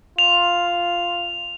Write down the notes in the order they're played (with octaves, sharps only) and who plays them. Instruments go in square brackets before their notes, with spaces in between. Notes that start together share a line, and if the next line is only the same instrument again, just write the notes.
[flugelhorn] F4 [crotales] F7